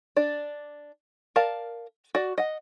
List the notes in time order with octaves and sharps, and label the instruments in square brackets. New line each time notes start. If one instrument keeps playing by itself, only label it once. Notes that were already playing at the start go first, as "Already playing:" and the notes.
[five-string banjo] D4 D5
A#4 D5 F5 A5
F#4 D5
D#5 F#5